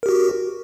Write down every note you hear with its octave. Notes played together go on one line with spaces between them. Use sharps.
F#4 G4 A#4